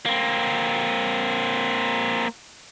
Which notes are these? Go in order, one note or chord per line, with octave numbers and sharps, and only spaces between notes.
A#3 C4